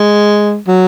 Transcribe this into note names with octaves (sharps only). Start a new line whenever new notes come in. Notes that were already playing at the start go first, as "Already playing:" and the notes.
Already playing: G#3
F#3